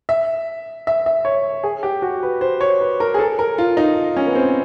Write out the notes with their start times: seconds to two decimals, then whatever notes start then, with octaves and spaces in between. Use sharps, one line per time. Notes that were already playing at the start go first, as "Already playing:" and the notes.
0.09 E5
0.87 E5
1.06 E5
1.25 C#5
1.63 G#4
1.83 G4
2.02 F#4
2.23 B4
2.41 C5
2.61 C#5
2.81 B4
3.00 A#4
3.14 G#4
3.19 A4
3.39 A#4
3.58 F4
3.77 D#4
4.17 C#4
4.26 B3
4.35 C4